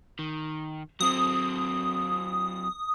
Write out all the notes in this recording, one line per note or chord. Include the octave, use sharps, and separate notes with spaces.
D#3
F#3 C4 D#6